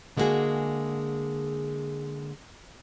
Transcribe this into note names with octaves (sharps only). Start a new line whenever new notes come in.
D3 G#3 A#3 B3 F#4 G#4